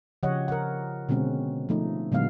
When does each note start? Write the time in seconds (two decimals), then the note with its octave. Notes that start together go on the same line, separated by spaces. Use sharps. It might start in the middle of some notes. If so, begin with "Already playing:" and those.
0.23 C#3 F3 G4 C#5 D#5 F#5
0.48 A#4 F#5
1.09 B2 D3 G#3 C4 C#4
1.69 F3 A3 D#4
2.12 A#2 D3 F#3 G#3 B3 F5